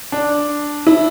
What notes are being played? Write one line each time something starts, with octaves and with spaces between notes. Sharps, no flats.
D4
E4